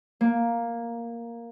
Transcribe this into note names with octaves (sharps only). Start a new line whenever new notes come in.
A#3